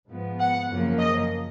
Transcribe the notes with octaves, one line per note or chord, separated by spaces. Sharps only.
G#2 F3 B3
F#5
F#2 C#3 F3 A#3
D#5